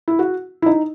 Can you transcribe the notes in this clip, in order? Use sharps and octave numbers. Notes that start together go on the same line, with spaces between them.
E4
F#4
E4
D#4